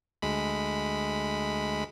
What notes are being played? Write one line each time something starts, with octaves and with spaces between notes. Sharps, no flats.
D2 G#3 B5